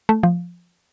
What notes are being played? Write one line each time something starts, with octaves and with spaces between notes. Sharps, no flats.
A3
F3